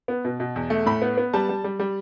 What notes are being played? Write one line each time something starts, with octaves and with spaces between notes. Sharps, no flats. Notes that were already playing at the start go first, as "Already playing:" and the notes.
B3
B2
B2
E2
A3
A2 B5
B3
B3
G3 A5
G3
G3
G3